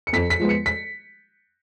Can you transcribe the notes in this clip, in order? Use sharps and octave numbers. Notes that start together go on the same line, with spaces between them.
C#7
F2 B6
B6
F3 G#3 B3
C#7
B6